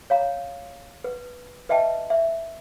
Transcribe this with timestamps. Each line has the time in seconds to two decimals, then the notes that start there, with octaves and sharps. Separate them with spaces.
0.10 C#5 F5 A#5
1.04 B4
1.69 B4 D#5 E5 G5 A5
2.10 E5